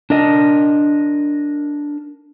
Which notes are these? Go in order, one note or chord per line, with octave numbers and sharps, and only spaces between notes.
D4 A#4 D#5